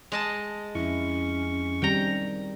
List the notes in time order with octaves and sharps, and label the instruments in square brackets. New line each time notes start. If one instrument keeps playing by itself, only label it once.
[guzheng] G#3 D#5 A5
[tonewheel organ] F2 C#6 [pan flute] C#4 [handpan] E4
[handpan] D#3 G3 C4 [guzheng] G5 A#5